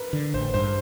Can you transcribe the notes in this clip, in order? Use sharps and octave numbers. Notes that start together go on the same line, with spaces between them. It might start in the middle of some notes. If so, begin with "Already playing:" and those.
Already playing: A#4 B4
D3
A1 C5
G2 C5